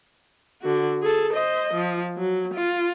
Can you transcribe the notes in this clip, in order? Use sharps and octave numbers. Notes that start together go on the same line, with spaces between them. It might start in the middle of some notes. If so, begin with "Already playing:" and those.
D3 F#4
G#4 A4
C5 D#5
F3
F#3
F4